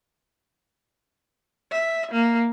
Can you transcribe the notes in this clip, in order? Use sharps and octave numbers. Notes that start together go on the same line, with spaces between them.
E5
A#3